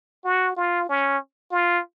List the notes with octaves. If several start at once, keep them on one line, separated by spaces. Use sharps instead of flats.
F#4
F4
C#4
F4